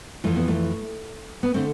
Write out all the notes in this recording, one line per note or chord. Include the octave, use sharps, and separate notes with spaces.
F2 E3 A3
B3
A3
B3
D3 A3 C4